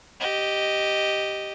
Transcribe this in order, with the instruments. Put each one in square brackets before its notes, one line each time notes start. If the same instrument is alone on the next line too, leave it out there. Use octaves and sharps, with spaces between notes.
[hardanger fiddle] G4 D#5